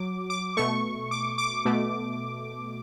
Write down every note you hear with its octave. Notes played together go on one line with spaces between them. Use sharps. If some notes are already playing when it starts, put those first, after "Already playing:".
Already playing: F#3 D6
D6
B2 A3 C#6
D6
D6
B2 A3